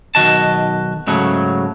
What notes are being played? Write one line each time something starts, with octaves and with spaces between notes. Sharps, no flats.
B1 D#3 F#4 D#5 A5
G#2 C#3 F#3 A3